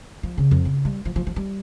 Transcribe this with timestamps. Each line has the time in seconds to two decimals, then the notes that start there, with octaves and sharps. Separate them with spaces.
0.23 F3
0.38 C#3
0.51 F2
0.65 C#3
0.85 G3
1.05 F3
1.16 F3
1.27 F3
1.36 G3